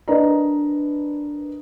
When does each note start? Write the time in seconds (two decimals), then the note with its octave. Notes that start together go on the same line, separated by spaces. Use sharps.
0.08 D4 A#4 B4 D5 D#5 A#5